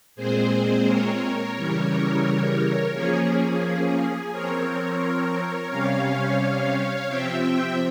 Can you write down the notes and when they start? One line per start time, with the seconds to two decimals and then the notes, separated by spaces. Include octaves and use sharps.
0.15 A#2 G#3 C4 G#4 C5
0.85 A#4 C#5
1.54 C#3 E3 G3
2.92 F3 A#3 C#4 G#4
4.31 F3 C4 A#4 C#5
5.69 C3 G3 C#4 C#5 F5
7.07 C3 F3 C4 E5 G5